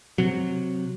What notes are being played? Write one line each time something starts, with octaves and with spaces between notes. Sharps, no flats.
C3 F#3